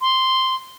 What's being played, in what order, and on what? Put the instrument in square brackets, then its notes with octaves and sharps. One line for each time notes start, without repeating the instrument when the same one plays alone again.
[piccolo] C6